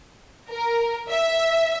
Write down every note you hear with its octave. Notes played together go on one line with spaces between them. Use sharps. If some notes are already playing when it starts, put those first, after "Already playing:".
A#4
E5